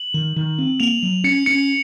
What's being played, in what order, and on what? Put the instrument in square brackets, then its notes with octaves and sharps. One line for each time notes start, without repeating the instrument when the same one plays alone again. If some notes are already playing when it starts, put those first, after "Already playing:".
Already playing: [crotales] F#7
[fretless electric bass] D#3
D#3
C4
[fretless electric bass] A#3 [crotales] F7
[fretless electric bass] F#3
[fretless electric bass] C#4 [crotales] C#7
[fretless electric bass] C#4 [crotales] C#7